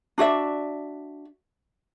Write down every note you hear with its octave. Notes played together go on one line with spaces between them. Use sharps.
D4 F#4 D5 E5